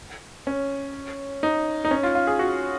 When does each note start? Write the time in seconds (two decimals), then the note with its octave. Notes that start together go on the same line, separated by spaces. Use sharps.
0.47 C#4
1.43 D#4
1.85 D#4
1.91 C#4
2.03 F4
2.15 F4
2.27 G#4
2.39 F#4